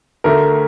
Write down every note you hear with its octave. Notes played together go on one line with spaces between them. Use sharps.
D2 D3 A3 A#4